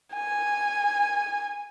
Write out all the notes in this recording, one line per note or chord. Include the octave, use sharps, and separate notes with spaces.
G#5